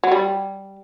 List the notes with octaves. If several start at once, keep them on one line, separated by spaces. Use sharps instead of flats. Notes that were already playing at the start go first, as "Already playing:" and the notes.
F#3
G3